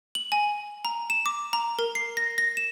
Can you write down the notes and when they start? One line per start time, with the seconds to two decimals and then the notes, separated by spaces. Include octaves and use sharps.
0.15 F#7
0.32 G#5
0.85 A#5
1.10 E7
1.26 D6
1.53 A#5
1.79 A#4
1.95 C7
2.17 A#6
2.38 A#6
2.57 E7